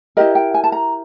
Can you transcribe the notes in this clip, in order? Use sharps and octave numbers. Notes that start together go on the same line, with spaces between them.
E4 G4 A#4 D#5
G5
G#5
A5
A#5